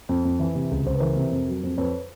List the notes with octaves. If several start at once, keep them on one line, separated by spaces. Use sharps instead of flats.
F2
F2
E3
C3
C#2
C#2 C5
B4
E3 A#4 C5
C3
F2
F#3
F2
F2 B4 C#5